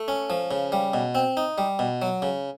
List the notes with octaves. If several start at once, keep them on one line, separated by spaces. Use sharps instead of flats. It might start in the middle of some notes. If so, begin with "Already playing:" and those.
Already playing: A3
C#4
F3
C#3
G3
B2
C4
D#4
G3
B2
F#3
C#3